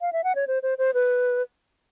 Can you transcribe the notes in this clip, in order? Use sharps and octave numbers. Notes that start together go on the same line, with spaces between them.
F5
E5
F#5
C#5
C5
C5
C5
B4